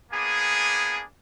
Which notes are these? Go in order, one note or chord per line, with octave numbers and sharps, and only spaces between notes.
A#3 B3 D4 G#4 G#5